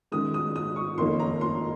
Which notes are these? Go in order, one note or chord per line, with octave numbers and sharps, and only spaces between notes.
F#2 D#3 G#3 D#6
D#6
D#6
C#6
F#1 F2 D#3 A#3 C#4 C6
A#5
C6